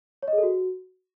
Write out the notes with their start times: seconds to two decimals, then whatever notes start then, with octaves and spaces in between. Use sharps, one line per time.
0.23 C#5
0.28 D#5
0.33 G#4
0.38 A4
0.43 F#4